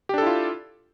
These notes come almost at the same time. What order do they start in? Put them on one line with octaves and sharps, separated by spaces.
G4 D4 A4 E4 F4